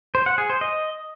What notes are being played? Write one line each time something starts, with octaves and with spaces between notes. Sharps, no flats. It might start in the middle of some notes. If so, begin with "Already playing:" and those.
C5
F#5
G#4
C5
D#5